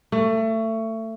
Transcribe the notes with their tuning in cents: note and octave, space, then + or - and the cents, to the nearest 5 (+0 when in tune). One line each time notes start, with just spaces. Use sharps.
A3 +25